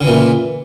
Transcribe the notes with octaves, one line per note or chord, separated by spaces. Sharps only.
A#2 C#3 E3